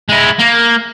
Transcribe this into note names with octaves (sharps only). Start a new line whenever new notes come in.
G#3 E4
A#3